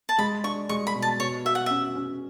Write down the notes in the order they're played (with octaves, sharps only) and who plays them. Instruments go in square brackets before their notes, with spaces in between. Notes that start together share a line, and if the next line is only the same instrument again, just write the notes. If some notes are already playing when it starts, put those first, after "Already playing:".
[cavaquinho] A5
[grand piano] G#3 [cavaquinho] B5
[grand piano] D4 [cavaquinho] C#6
[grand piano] G#3 [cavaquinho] C#6
[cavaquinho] B5
[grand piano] B2
[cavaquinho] A5
[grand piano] B2 [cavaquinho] C#5
[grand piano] F#4 [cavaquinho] E5
[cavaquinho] F#5
[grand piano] C#4 [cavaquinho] E5
[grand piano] C#4